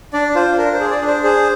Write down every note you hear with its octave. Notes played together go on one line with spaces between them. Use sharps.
D4 D5
F4 C5
D4 A#4
C5
G#4
D5
D4
C5
G#4 C5